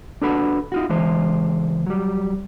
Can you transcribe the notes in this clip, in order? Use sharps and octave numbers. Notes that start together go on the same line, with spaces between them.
D4 F#4 A4 B4 F#5 B5
D#4 F4 F#4
C#2 E3 G#3 C5
F#3 G3